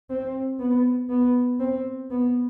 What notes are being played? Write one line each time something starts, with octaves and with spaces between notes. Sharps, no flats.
C4
B3
B3
C4
B3